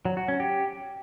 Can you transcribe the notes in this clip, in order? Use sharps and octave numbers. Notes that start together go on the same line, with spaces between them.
F#3
F#4
C#4
G4